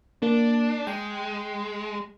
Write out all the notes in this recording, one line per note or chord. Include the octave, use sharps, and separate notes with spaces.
A#3 D4
G#3 G5